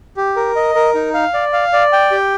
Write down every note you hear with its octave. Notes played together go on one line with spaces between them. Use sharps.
G4
A#4
D#5
A#4
D#4
F5
D5
F5
D5
G5
G4